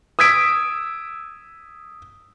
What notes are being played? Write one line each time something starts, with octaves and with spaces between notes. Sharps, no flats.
D#6 E6 G#6 B6 D7